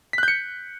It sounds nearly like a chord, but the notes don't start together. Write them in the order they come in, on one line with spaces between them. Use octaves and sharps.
B6 F#6 G6 C#7